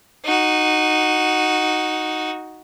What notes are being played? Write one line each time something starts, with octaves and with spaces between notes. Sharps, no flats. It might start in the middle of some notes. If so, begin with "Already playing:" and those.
D#4 F#4